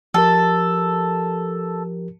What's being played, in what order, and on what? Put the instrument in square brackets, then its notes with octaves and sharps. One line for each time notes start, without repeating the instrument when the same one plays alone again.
[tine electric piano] F3 G4 A#4 [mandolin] A4